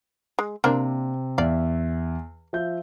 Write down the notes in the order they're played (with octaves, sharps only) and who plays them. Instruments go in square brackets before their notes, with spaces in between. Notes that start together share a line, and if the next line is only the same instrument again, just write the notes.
[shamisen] G#3
[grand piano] C3 [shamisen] A#3 C4 D4
[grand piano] E2 E5 [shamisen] D5 F5
[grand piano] F3 E5 G6